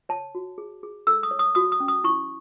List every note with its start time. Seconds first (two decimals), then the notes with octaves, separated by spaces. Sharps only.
0.09 C#5 A5
0.35 F#4
0.58 G#4
0.83 G#4
1.07 A4 E6
1.23 D#6
1.31 C#5
1.39 D#6
1.55 F#4 D#6
1.72 D#6
1.80 C#4
1.88 D#6
2.04 E4 C#6